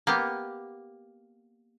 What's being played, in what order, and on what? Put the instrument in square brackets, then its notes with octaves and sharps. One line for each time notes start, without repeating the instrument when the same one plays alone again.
[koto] A#3 B3 G4